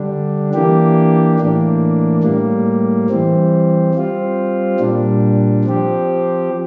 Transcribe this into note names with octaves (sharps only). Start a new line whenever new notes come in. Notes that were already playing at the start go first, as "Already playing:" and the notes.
Already playing: D3 G3 D4
E3 A#3 D4 G4
A2 E3 A#3 D4
A2 G3 A#3
E3 G3 C4
G3 C4 F4
A#2 G3 D4
F3 C4 G4